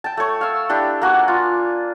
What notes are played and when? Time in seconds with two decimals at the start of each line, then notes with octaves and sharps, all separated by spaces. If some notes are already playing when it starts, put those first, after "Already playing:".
0.04 G5 A5
0.17 A3 C#5
0.41 F5 E6
0.69 D4 E4 G4
1.02 A#3 F#4 G#5
1.28 F4